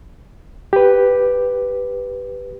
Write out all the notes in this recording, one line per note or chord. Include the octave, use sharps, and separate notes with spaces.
G4 B4